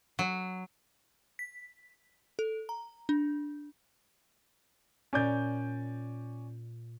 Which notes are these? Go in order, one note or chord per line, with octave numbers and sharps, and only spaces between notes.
F#3
B6
A4
A#5
D4
A#2 C#4 D5 G6 D7